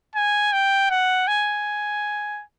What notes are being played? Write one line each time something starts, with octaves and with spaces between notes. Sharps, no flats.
G#5
G5
F#5
G#5